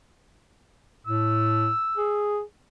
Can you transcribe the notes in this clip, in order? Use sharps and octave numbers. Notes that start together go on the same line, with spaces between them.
A2 E6
G#4